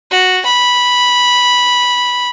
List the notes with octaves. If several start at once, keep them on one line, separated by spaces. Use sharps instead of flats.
F#4
B5